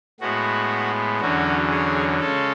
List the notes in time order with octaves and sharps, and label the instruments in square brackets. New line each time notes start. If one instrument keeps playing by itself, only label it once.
[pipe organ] A2 G#3 B3 F#4
E2 D3 F#3 C#4 F#4
G#4
C#3 G#3 C#4 A4